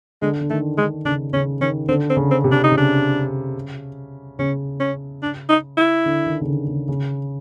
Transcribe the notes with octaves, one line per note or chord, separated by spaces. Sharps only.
D3 G#3
D3
D#3 A3
D3 G#3
C#3 D4
C#3 C#4
D#3 C#4
D3 C4
C4
C#3
C4
C3
D4
D#4
C#3
D4
C#3 C#4
C#4
D4
D#4
E4
D3
D#3
C#3
D3
C#3
C#3